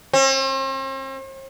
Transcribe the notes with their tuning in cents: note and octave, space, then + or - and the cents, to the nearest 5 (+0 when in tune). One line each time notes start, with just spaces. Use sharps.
C4 +45